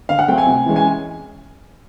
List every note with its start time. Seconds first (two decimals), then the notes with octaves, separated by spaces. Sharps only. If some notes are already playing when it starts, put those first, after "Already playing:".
0.09 D3 F5
0.19 F#5
0.28 F#3 A3 C4 G5
0.38 G#5
0.46 C3
0.66 E3 G#3 C#4
0.76 G#5